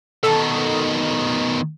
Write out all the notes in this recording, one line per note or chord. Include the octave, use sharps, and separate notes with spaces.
B2 D#3 A4